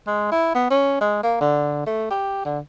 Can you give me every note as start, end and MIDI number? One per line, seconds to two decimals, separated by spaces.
0.07 0.30 56
0.32 0.51 64
0.55 0.69 59
0.70 0.98 61
1.01 1.20 56
1.23 1.38 58
1.41 1.85 50
1.86 2.06 57
2.10 2.42 67
2.45 2.59 50